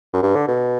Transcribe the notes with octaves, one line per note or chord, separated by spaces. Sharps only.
F#2
G2
D3
B2